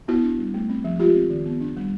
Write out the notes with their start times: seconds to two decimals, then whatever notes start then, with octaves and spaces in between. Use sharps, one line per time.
0.08 B3 E4 F#4
0.24 D4
0.39 G3
0.54 A3
0.69 C4
0.84 F3
0.99 G#3 F4 G4
1.16 C4
1.30 D#3
1.46 B3
1.61 D4
1.77 G3